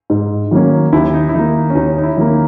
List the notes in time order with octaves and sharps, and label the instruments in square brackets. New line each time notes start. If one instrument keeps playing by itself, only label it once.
[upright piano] G#2
D#3 F#3 A#3 C#4
[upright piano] D#2 [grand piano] E4
[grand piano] D#4
E4
[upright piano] D#3 A#3 [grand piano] D#4
[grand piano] C#4
[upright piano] D#2 [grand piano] D#4
[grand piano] D#4
E4
[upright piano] D#3 A#3
[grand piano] D#4